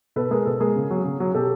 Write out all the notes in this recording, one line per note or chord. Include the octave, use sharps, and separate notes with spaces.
B2 A4 B4
G#3 G#4 A#4
B2 A4 B4
G#3 G#4 A#4
C#3
F#3
C#3
F#3
B2 G4 A4